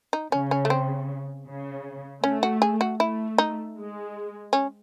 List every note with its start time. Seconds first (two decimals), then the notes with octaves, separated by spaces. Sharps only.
0.13 D#4
0.32 C#3 C#4
0.51 C#4
0.65 A3
0.70 C4
1.47 C#3
2.23 A3 C#4
2.43 F#4
2.62 G#4
2.81 F#4
3.00 A3 E4
3.38 D#4
3.77 G#3
4.53 C#4